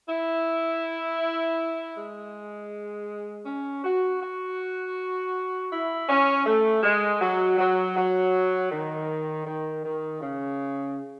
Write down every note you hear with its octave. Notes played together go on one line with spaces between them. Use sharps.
E4
G#3
C#4
F#4
F#4
E4
C#4
A3
G#3
F#3
F#3
F#3
D#3
D#3
D#3
C#3